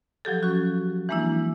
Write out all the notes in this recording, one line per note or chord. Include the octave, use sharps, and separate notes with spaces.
F3 F#3 G4 A4
C#4 F#4
E3 G#3 A#3 D4 E4